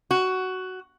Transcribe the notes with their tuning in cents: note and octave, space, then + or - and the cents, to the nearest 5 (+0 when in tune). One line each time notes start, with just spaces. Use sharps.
F#4 +10